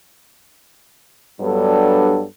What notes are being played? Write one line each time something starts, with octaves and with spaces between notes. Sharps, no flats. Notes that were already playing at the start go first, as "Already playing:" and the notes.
G2 F#3 G3 B3 D4 A4